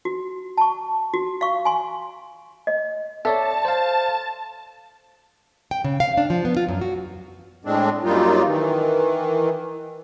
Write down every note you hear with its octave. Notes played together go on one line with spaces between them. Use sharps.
F#4
A5 C#6
F#4
F5 C#6
G#5 C6
D#5
A4 C#5 D5 E5 A5
C5 F5
G5
C#3
F5
D4
F3
B3
F4
F#2
F#4
A2 G#3 C4 D4
F#2 F#3 G3 A#3 D#4 F4
D#3 E3